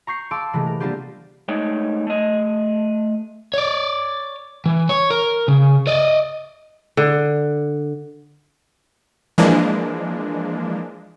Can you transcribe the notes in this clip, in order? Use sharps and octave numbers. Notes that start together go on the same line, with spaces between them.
A#5 C#6 G6 C7 C#7
F5 A5 C6 D6 E6 D7
C3 E3 G#3 A3
A#4
G3 A#3 B3 D4 F4 G4
G#3 A3 D#4 C#5 D5
A3 D#5
C#5 D5
E3
C#5
A#4
C#3
D5 D#5
D3
E3 F3 G#3 A#3 D4